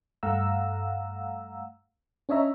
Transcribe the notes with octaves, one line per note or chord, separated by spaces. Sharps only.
G2 A3 F5 F#5 A#5 E6
C#4 D4 C#5 D#5 E5 A#5